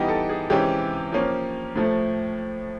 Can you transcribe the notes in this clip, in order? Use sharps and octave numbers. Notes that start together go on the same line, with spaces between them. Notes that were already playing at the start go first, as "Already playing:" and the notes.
Already playing: E3 G3 B3 D#4 G4
A4
G#4
C3 E3 G#3 C#4 G4
F3 A#3 C#4
A2 F3 A3